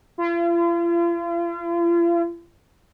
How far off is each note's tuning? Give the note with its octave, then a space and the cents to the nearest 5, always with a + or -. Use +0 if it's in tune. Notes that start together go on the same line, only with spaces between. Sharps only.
F4 -40